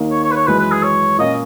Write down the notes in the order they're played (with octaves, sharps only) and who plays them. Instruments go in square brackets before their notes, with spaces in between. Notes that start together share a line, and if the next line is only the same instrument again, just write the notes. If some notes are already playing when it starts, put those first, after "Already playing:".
Already playing: [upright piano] D#2 D#3 A#3 D#4
[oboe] C#5
C#5
B4
C#5
[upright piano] F#2 E3 G#3 [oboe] B4
[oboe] B4
G#4
C#5
[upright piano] A#2 A#3 C#4 [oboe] D#5